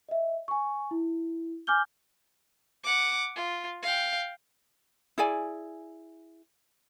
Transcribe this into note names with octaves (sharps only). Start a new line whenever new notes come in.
D#5 E5
G#5 C#6
E4
G#5 D6 F6 G6 G7
F#5 D6
F4
F5 G5
E4 G#4 D5 G#5